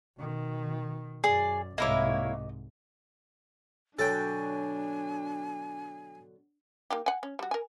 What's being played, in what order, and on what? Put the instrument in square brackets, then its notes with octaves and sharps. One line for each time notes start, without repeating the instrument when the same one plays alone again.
[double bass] B2 D#3
[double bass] F#2 [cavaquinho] G#4 [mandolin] D5
[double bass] C2 G#2 [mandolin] A#3 E4 C#5 [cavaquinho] D#5 D6
[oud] B2 D3 F#3 [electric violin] D4 [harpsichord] A4 G5 [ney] G#5
[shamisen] A#3 D#4 G4
F#5 G#5
C#4
G3 F#4
A#4 G#5